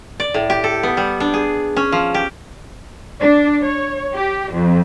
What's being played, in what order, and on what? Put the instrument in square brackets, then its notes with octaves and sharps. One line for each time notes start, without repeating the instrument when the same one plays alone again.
[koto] D5
A2
G4
A4
B3
G3
D4
G#4
C#4
F3
G4
[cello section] D4
C#5
G4
F2